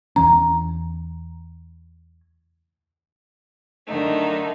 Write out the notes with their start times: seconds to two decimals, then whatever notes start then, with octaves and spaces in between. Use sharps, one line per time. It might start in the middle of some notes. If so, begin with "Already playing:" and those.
0.16 E2 E3 C#4 A#5
3.87 F#2 D3 D#3 A3 D#4